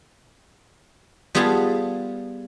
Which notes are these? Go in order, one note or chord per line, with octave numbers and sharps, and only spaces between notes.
G3 B3 F4 G#4 A4 A5